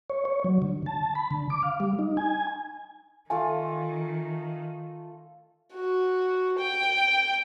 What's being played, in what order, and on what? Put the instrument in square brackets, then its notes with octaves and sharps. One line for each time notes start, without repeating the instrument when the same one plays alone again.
[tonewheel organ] C#5
C#5
F#3
D3
A5
B5
D3
D6
F5
G3
D#4
G#5
[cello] D#3 [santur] A3 F4 A4 [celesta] G#5
[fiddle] F#4
G5